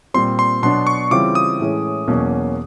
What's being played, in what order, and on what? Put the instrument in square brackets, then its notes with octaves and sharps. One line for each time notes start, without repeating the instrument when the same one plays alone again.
[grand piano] A#2 G3 C4 [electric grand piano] C6
[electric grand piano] C6
[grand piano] B2 F#3 B3 D4 [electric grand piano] C6
[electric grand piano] C#6
[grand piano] C#3 E3 G3 C4 F4 [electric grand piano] D6
[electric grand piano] D#6
[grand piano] A2 E3 G#3 C#4
E2 B2 F#3 A#3 C#4